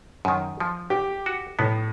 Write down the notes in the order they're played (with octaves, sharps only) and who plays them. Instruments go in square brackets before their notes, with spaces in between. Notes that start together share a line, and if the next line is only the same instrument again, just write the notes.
[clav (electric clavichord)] F#2 D#3
F3
[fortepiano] G4
[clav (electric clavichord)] F#4
[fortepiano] A2 [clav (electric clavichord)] B3